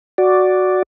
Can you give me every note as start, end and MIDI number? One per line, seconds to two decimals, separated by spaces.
0.18 0.83 66
0.18 0.83 74